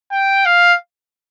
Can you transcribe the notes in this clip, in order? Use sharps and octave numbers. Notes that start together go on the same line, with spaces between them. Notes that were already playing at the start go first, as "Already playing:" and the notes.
G5
F5